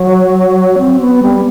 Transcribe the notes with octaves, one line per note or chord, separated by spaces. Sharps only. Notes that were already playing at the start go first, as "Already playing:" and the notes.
Already playing: F#3
C4
B3
G3